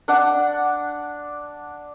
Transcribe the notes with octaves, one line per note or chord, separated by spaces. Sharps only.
D4 F#5